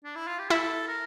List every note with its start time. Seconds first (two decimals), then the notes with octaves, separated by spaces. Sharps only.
0.04 D4
0.16 E4
0.27 F4
0.39 G4
0.50 E4 A4
0.88 A#4